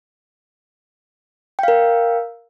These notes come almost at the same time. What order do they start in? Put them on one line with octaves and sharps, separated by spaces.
G5 F5 A#4